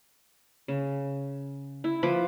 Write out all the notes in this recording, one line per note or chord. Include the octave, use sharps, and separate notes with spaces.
C#3
E4
F3 B4 B5 D6